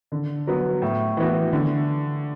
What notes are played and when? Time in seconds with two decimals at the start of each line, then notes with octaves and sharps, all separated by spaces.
0.12 D3
0.47 F#3 B3 F#4
0.82 A2
1.17 E3 B3 F#4
1.52 D3